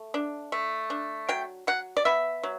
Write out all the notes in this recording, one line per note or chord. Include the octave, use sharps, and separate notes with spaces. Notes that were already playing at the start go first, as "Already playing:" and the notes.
Already playing: A3
D4
A3
D4
F#3 G5
F#3 F#5
D5
B3 E5
F#3